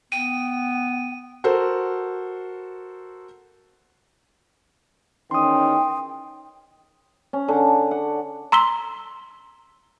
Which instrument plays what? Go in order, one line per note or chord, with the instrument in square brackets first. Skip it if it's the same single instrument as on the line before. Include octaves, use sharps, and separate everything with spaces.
[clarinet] B3 [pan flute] G5 [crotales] D#7
[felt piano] F#4 A4 A#4 C5
[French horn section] E2 D#3 C#4 [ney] G5 [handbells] C6 D#6
[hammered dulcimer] C#4
D3
F#5
[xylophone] A#5 C6 E6 B6 G7